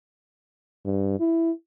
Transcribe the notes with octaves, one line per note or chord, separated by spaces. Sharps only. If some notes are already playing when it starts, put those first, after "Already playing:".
G2
E4